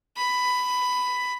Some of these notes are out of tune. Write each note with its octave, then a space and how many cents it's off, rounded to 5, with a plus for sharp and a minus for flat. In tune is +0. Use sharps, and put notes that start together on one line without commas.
B5 +10